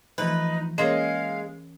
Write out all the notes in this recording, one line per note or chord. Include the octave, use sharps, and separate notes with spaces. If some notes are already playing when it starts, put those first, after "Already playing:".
D2 E3 F3 A3 D#4 B4
G#3 A#3 C#4 A#4 C#5 F5 C6